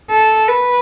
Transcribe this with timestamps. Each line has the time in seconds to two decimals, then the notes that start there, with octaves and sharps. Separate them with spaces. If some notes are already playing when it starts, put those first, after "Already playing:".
0.10 A4
0.48 B4